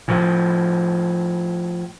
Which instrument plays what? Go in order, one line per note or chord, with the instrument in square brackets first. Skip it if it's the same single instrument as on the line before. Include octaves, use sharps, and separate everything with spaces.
[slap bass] A2 F3